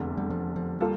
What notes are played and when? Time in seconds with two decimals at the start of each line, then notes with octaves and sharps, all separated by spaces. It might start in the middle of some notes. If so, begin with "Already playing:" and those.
Already playing: F1 E2 D3
0.18 G3
0.30 F3
0.56 F3
0.80 G3 A#3 F4 A4